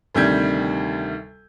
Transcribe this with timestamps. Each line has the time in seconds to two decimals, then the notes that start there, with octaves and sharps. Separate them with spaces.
0.15 D2 C3 D#3 G3 G6 G#6